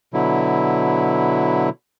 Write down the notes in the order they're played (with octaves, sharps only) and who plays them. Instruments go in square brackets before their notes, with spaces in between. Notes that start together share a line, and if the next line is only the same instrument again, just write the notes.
[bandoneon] B2 D3 F#3 E4